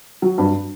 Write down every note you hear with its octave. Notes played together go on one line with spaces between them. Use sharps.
F#3
G2